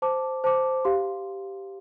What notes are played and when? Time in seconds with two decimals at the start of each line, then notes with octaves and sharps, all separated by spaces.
0.02 C5 A5 D6
0.44 C5 A5 D6
0.85 G4 F5 C6